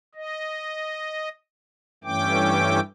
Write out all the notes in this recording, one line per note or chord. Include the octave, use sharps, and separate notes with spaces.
D#5
G2 E3 A3 C#4 G5 D6